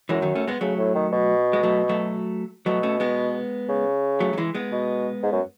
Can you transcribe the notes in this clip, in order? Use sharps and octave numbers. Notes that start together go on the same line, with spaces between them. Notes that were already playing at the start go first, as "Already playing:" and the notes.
F#2 E3 G#3
D#3 F#3
A3 C#4
G#3 B3
C#3 F#3 A3
A2
D#3
B2
G#3
F#3 A3
F#3 A3
B2 F#3 A3
A3 C#4
G#3 B3
C#3
F#3 A3
F#3
E3 G#3
G#3 B3
B2
G#2
F#2